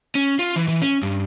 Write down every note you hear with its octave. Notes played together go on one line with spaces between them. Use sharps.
C#4
F4
E3
E3
C#4
G2